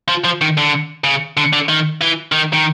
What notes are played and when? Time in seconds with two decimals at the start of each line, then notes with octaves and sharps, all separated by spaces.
0.08 F3
0.25 F3
0.41 D#3
0.57 D3
1.04 C#3
1.37 D3
1.53 D3
1.69 D#3
2.01 E3
2.32 D#3
2.54 D#3